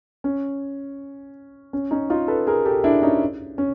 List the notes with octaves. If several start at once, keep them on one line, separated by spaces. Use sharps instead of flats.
C#4
C#4
C#4 D#4
D#4 F4
A4 B4
G#4 A#4
G4 A4
D4 E4
C#4 D#4
C#4